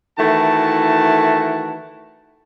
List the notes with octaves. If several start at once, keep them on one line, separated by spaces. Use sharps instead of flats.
D#3 E3 A3 E4 F#4 A5